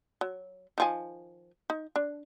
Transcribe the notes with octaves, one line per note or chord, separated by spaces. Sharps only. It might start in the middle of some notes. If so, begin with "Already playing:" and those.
F#3
D#3 F3 G#5
D#4
D4